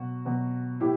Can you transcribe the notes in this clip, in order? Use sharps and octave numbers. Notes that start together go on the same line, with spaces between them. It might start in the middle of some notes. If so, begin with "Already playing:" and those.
Already playing: B2 F#3 F#4
B2 F#3
A2 E4 G4